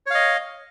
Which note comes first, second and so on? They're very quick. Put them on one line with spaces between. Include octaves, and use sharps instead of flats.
C#5 F5 D#5